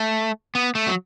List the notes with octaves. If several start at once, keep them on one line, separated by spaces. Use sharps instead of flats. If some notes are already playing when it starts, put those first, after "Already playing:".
Already playing: A3
B3
A3
F#3